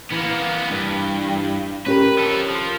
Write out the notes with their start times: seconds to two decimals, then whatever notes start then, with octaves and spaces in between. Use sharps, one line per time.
0.11 E3 A#3 B3
0.71 G2
1.86 C#4 G4 A#4 B4
2.18 F3 A4
2.50 F3